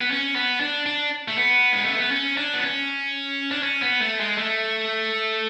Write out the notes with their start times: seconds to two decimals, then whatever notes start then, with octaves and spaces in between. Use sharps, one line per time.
0.01 B3
0.11 C#4
0.35 B3
0.60 D4
0.86 D4
1.28 A3
1.37 B3
1.73 G#3
1.85 A3
1.98 B3
2.11 C#4
2.37 D4
2.54 B3
2.63 C#4
3.51 D4
3.63 C#4
3.82 B3
4.00 A3
4.20 G#3
4.38 A3